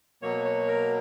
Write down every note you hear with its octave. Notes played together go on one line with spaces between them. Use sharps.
B2 F#3 A#3 C#5
C#5
A#4